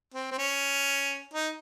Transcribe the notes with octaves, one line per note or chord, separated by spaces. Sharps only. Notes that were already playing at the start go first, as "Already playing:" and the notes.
C4
C4
C#4
D#4